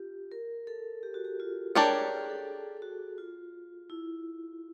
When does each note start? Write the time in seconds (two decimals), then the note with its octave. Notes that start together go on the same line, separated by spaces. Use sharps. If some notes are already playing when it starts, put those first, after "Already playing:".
Already playing: F4 G4
0.32 A#4
0.67 A4
1.03 G4
1.14 F#4
1.25 G4
1.40 F4
1.75 D4 G4 G#4 A#4 C#5
2.11 A4
2.20 G#4
2.29 A4
2.82 F#4
3.18 F4
3.90 E4